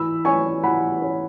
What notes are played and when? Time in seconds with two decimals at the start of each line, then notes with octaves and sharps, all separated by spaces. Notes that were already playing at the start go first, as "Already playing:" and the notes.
Already playing: E3 B5 E6
0.25 C#4 G#5 C#6
0.63 E3 F#5 B5
1.02 C#4